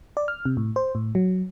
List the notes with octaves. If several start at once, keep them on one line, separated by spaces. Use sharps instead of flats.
D5
F6
C3
A2
C5
A2
F#3